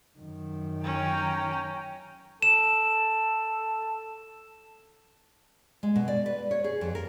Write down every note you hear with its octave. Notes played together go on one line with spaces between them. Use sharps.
F#2 D#3
C#4 G5 A#5
A4 E7
G#3
B2
D5
B4
C#5
G#4
F2
A#4